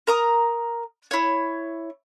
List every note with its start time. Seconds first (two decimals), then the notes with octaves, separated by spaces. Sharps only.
0.07 A#4 A#5 D#6
1.11 E4 C#5